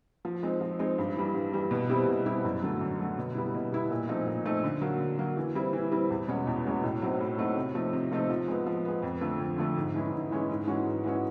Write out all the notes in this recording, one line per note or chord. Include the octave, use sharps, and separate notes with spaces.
F3
G#3 C4 D#4
F3
G#3 C4 D#4
G2
E3 G3
G2
E3 G3
B2
G3 C4 E4 G4
B2
G3 C4 E4 G4
F#2
D3 F#3 A3
F#2
D3 F#3 A3
B2
G3 B3 E4
B2
G3 B3 E4
A#2
F3 A3 C4 D#4
A#2
F3 A3 C4 D#4
D3
F#3 A#3
D3
F#3 A#3
E3
G3 C4 E4
E3
G3 C4 E4
E2
B2 G#3 C#4 F#4
E2
B2 G#3 C#4 F#4
A2
F#3 A3 C4 D#4
A2
F#3 A3 C4 D#4
C3
F3 A3 C4 D#4
C3
F3 A3 C4 D#4
F3
G#3 B3
F3
G#3 B3
F2
D3 F3 A3
F2
D3 F3 A3
G#2
E3 G#3 C#4 E4
G#2
E3 G#3 C#4 E4
G#2
E3 G#3 C#4 F#4
G#2
E3 G#3 C#4 F#4